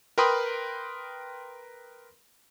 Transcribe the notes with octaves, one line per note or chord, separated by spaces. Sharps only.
A#4 B4 G5 B5 C6 D#6